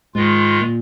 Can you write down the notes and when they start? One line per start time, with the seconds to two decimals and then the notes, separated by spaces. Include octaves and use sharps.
0.15 G#2 D#3 G#3 F4
0.61 A#2